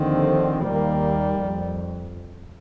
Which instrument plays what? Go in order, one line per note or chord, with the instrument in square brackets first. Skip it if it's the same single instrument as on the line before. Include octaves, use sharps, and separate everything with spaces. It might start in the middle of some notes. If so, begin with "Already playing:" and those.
Already playing: [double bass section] D#2 D3 F3 C4 [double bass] D#3
[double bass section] D#2 D#3 A#3 [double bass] G3
[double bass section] F2